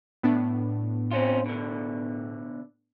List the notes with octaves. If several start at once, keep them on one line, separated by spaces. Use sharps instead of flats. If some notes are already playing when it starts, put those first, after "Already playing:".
A2 B3 D4
C4 C#4 F4
B2 D3